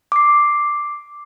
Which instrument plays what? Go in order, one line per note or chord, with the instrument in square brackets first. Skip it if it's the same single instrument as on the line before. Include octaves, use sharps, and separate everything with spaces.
[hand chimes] D6 C7